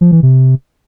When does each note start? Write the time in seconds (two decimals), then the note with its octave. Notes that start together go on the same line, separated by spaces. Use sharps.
0.01 F3
0.12 E3
0.23 C3